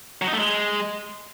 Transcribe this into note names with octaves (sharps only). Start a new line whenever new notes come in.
F#3
D#4
A3
G#3